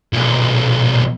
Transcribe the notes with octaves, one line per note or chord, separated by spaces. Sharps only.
B1 A#2